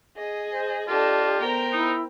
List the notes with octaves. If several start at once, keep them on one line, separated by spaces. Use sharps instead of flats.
G#4 D#5
C5
D4 F4 G4 A4 D#5
B3 A#4 C5 G5 A#5
D#4 E4